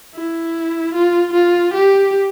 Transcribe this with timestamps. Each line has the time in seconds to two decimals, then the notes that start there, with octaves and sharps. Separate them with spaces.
0.15 E4
0.94 F4
1.33 F4
1.74 G4